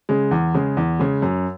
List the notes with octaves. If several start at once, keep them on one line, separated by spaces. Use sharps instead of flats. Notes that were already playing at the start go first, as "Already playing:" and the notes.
C#3 G#3
E2
C#3 G#3
E2
C#3 G#3
F#2